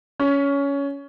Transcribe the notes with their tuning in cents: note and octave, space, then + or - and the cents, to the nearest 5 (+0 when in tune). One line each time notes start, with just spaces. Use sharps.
C#4 +15